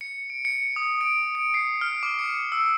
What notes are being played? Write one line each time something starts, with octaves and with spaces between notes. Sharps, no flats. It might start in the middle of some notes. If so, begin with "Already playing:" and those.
C#7
D7
C#7
D#6
D7
D7
C7
F6
D6
C#7
E6